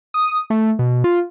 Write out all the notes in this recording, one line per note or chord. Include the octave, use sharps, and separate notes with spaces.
D#6
A3
B2
F4